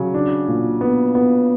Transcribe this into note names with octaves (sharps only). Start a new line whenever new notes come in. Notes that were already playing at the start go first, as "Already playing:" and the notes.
Already playing: C#3 F#3
D4
A#2
B3
B3